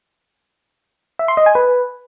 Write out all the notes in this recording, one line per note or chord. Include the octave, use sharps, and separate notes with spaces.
E5
C6
D#5
G#5
B4